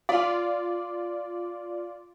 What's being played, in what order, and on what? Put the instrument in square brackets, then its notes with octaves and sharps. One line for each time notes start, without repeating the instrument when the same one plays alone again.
[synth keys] F4 D5 [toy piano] F5